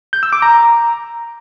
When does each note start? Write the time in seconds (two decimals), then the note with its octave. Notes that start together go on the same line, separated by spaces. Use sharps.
0.13 G6
0.23 E6
0.33 D6
0.42 A#5